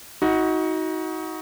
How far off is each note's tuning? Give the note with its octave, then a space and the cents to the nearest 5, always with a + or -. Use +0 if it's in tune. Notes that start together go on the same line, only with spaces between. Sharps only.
D#4 +30 F#4 +0